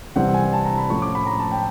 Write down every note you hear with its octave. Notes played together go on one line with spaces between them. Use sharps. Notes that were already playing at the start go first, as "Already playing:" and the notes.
C2 C3 E3 G3 C4 F#5
G#5
A5
A#5
B5
A2 F3 A3 C#4 C#6
D6
B5
A#5
A5
G5